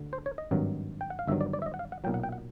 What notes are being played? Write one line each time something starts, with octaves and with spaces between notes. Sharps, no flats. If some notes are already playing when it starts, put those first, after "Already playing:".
Already playing: D2 D3
C5
C#5
D#5
G#1 G2 D#3 F#3
G5
F#5
F5
G1 G2 D#3 F#3 E5
D5
D5
E5
D#5
F#5
F5
F#5
B1 A#2 F#3 G5
F#5
G5
F#5